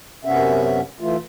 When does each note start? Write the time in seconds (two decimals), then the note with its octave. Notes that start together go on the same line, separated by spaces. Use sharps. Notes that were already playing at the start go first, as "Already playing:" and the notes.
0.25 F#2 C3 B3 C#4 E5
1.00 E3 A3 F4